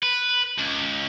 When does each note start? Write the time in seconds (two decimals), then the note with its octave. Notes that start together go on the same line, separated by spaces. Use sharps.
0.03 B4
0.58 C#2